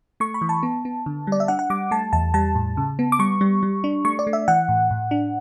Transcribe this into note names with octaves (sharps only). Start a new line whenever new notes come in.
A3 C#6
B5
E3
A5
B3
B3
D3
G3 D5
E5
D4 F#5
F#5
G3 D6
A3 A5
E2 A5
G3 A5
A2
C#3
B3
D6
G3 C#6
G3
G3
D4
A3 C#6
D5
A3
E5
E3 F#5
A2
A2
D4